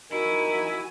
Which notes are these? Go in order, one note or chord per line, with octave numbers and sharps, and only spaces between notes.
D#4 E4 F#4 A#4 G#5